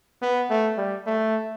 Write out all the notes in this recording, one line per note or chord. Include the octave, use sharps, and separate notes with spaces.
B3
A3
G3
A3